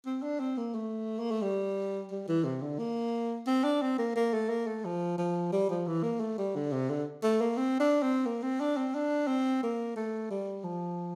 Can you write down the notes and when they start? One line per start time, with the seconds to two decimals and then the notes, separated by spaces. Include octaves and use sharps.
0.06 C4
0.22 D4
0.40 C4
0.58 A#3
0.75 A3
1.19 A#3
1.31 A3
1.42 G3
2.11 G3
2.28 E3
2.44 C3
2.62 D3
2.79 A#3
3.47 C4
3.64 D4
3.82 C4
3.98 A#3
4.16 A#3
4.33 A3
4.49 A#3
4.67 A3
4.85 F3
5.18 F3
5.52 G3
5.70 F3
5.87 E3
6.03 A#3
6.20 A3
6.38 G3
6.55 D3
6.72 C3
6.89 D3
7.23 A3
7.41 A#3
7.57 C4
7.80 D4
8.02 C4
8.26 A#3
8.43 C4
8.60 D4
8.77 C4
8.94 D4
9.27 C4
9.63 A#3
9.96 A3
10.30 G3
10.64 F3